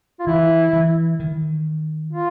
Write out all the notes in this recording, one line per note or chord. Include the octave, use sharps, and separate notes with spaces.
F4
E3 E4
E3
D#3
F4